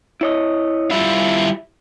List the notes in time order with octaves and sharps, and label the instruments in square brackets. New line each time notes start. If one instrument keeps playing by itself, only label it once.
[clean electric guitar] E4 C#5 D#5
[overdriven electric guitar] G3 F4 [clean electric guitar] E4